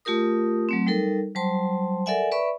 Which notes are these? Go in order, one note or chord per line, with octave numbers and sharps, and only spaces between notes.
A3 F4 G4 A#4 D#6
F#3 A3 C4
G3 D#4 A4 A#4
F#3 G3 C5 A5 C6
A4 A#4 D5 E5 F#5 G#5
B4 D5 E5 B5 C#6